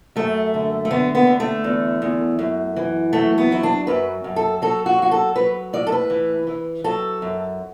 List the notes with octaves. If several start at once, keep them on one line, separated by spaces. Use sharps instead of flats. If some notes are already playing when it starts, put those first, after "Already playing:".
F#2 A3
D3
A3
D3 B3
B3
D3
A3
E2
E2
F#2
E3
F#3 A3
B3
F#3 E4
D4
F#2 B4
F#2
A4
F#3 A4
F#4
F#3 F#4
A4
F#3 B4
A2 D5
A4
B4
E3
E3
F#3 A4
F#2